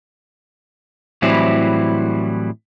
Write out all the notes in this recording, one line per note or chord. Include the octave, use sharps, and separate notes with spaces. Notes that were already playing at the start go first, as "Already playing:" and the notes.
A2 E3 F#3 G3 C4 E4